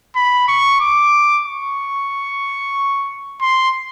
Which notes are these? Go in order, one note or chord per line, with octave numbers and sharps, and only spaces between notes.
B5
C#6
D6
C#6
C6